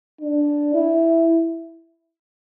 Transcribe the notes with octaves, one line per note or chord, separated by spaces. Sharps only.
D4
E4